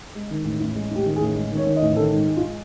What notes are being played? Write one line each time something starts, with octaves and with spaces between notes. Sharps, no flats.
G#3
D#3
A1
A1
G#3
A1 G4
D#3
G#4
A1
G#3
D#3
C#5
D#3
D#5
A1
D#3 A4
G#2
G#3
F4